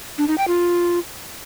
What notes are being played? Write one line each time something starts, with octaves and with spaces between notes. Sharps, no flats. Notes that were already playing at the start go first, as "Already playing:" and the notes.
D4
D#4
G5
F4